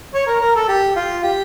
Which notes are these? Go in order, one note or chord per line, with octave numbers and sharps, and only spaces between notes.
C#5
A#4
A#4
A4
G4
F4
G4